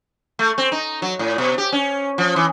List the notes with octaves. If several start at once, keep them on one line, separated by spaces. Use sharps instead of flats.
A3
C4
D#4
F#3
A2
B2
G4
C#4
F3
E3